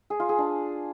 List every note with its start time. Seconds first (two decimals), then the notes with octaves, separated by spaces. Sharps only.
0.10 G#4
0.20 F4
0.29 G#4
0.38 D4